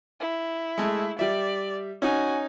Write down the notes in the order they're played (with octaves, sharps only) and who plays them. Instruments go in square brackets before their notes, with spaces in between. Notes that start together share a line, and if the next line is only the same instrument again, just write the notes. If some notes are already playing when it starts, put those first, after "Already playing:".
[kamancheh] E4
[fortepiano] G#3 A3
[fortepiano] G3 E5 [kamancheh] D5
[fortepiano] C#4 D#4 [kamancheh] F#4 G#5